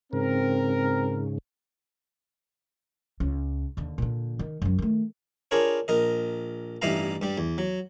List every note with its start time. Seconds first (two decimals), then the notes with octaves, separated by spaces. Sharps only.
0.13 G#2 C#3 C4 A#4
3.20 C#2 C#4
3.77 D#2 D3
3.98 A#2 D3
4.39 D#3
4.62 F#2 F#3
4.79 D#3 A3
5.51 D4 F4 G#4 A#4 C#5
5.88 A#1 A#4 D#5
6.82 A1 G2 D#4 E4 F5 A#5
7.22 G2 G3
7.38 E2
7.58 F#3